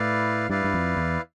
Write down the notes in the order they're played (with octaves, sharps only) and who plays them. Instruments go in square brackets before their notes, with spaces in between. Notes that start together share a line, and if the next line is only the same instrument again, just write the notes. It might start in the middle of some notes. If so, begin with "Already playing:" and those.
Already playing: [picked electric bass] A2 [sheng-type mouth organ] E4 B4 D5 F5
[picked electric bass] G2 [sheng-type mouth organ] E4 B4 D5 F5
[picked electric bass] G2
F2
E2